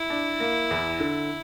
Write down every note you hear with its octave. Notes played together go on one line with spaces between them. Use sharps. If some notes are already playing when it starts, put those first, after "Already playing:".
Already playing: E4
D4
A#3
E2
D3